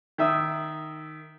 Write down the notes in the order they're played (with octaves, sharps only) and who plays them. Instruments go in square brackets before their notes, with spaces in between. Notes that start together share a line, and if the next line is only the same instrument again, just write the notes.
[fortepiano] D#3 E5 D#6